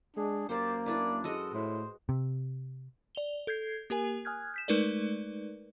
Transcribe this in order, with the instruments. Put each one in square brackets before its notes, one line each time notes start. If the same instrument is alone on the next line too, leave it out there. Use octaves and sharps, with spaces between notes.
[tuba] G#3 [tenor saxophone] D4 [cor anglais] G#4
[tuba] F#2 [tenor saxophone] A#3 [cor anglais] G4 [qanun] C5 D5
[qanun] D4 E4 B4 [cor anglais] D5
[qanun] G#3 F#4 D#5 [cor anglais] A4
[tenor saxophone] A2 [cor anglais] C5
[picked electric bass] C3
[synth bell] D5 F7 G7
A4 G6 G#6 C7
A#3 G4 A#4 G#5
G#5 D#6 F6 F#6 G#6
G6 B6 E7
G#3 A3 D#4 A#4 B4 D5